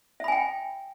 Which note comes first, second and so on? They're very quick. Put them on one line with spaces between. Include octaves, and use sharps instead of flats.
E5 B5 G#5 G5